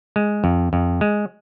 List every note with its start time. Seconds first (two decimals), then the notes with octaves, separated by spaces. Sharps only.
0.16 G#3
0.44 F2
0.73 F2
1.01 G#3